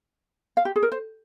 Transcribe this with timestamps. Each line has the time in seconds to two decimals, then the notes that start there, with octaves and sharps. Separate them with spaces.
0.57 F5
0.65 G4
0.76 G#4
0.83 A#4
0.92 C5